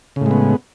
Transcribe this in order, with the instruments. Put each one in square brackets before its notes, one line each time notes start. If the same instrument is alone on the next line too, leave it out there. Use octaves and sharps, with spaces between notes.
[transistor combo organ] C#3
A2
G#3
B3